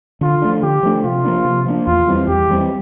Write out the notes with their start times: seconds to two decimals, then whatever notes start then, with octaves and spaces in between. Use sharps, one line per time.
0.21 D3 F4
0.42 F3 A3 D4
0.63 D3 G4
0.83 F3 A3 D4
1.04 C3 F4
1.24 F3 A#3 D4
1.45 C3
1.66 F3 A#3 D4
1.87 E2 F4
2.07 E3 G3 C4
2.28 E2 G4
2.48 E3 G3 C4